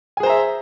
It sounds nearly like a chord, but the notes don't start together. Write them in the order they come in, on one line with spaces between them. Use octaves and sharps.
G#5 G#4 C5 A#5 E5